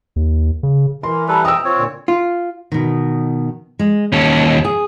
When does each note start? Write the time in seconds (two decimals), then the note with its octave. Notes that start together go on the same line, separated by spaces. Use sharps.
0.16 D#2
0.63 C#3
1.03 E3 A#4 C6
1.28 G3 A4 B4 A#5
1.45 G5 A#5 D#6 E6
1.64 C4 F4 C#5
1.77 A#2 D3
2.08 F4
2.72 B2 D#3
3.79 G#3
4.12 D#2 C#4 A4
4.65 G#4